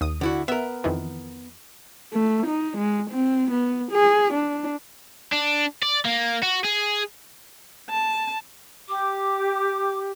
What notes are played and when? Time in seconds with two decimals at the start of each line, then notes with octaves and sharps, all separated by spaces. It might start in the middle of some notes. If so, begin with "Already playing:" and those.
0.01 D#2 D#6
0.21 D3 E4 F#4
0.48 B3 A#4 E5
0.84 F2 D#3 E3
2.13 A3
2.46 D#4
2.78 G#3
3.11 C4
3.51 B3
3.92 G#4
4.34 D4
5.32 D4
5.83 D5
6.06 A#3
6.43 F#4
6.64 G#4
7.90 A5
8.88 G4 D6